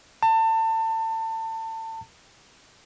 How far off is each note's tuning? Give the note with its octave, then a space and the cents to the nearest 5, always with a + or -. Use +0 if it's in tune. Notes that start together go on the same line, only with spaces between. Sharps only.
A5 +30